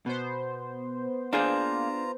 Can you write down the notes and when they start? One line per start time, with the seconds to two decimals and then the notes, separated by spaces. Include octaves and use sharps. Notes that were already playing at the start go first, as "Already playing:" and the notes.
0.06 B2 B3 C5
1.33 A#3 D4 F4 G#4 A#5 G6